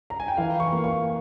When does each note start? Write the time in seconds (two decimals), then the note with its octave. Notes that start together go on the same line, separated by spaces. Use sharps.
0.10 A#5
0.20 G#5
0.28 G5
0.37 E3 F5
0.60 C#6
0.73 A#3
0.84 C#6